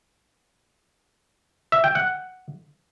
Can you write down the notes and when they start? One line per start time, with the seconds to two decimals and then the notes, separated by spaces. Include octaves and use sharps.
1.72 E5
1.84 G5
1.95 F#5